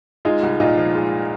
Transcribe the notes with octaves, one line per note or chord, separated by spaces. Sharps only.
G#3 D#4 F4
C2
A#2 D#4 F4
F3
G#3